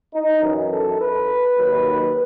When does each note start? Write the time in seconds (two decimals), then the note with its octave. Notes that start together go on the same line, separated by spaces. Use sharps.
0.13 D#4
0.42 F#2 E3
0.71 A4
1.00 B4
1.57 D#2 D#3 F#3